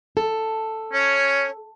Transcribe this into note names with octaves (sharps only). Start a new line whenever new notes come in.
A4
C#4 C#5